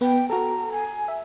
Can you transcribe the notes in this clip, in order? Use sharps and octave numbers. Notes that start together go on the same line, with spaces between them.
B3 B4 G5
F#4 A4 A#5
G#5
E5